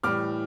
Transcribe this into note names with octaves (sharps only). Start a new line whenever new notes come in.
A2 E3 G3 D6 F6